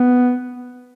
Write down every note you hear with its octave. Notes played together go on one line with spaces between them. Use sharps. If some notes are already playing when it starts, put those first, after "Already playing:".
Already playing: B3